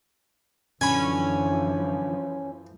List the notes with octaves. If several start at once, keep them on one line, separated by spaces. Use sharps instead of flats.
F#2 D3 E3 F3 C#4 G#5 B5